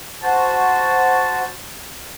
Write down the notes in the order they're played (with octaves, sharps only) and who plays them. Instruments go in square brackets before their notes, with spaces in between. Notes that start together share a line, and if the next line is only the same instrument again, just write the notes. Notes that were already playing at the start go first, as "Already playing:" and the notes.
[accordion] F#4 C5 [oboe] A5